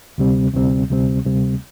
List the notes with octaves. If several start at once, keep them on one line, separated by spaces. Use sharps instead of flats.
D2 C3 G3 C4
D2 C3 G3 C4
D2 C3 G3 C4
D2 C3 G3 C4